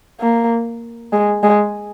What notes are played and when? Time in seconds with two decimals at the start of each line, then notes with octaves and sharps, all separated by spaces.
0.20 A#3
1.13 G#3
1.43 G#3